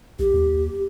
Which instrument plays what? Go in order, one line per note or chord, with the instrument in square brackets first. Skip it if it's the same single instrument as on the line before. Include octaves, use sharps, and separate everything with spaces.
[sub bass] B1 [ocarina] G4
[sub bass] D#2